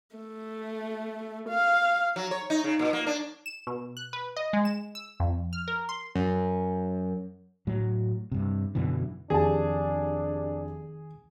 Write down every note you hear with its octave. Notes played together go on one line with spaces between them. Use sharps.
A3
F5
F#3
C#5
D#4
C#3
A#2
A#3
D4
E7
B2
F#6
B4
D#5
G#3
E7
E6
F2
F6
A#4
C6
F#2
A2 F#3
G2 C3
F#2 B2 D3 E3
F1 D#3 D4 G4 G#4 A5